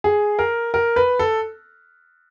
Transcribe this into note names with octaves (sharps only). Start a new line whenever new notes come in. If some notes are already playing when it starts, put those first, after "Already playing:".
G#4
A#4
A#4
B4
A4